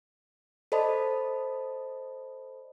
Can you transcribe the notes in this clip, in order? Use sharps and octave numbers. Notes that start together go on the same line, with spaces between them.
A4 C5 D5 D#5 A5 B5